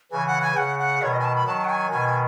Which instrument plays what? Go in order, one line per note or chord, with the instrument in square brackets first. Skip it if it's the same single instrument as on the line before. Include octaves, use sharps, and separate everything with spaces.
[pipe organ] C#3 E3 [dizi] G#5
[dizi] F#5
G#5
[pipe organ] C#3 [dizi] F#5
[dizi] F#5
[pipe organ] B2 D#3 [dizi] C#5
[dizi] D#5
G#5
A5
B5
[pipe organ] D#3 F#3 [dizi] A5
[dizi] F#5
G#5
[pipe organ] B2 D#3 [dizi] G#5